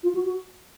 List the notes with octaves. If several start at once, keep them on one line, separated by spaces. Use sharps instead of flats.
F4
F#4
F#4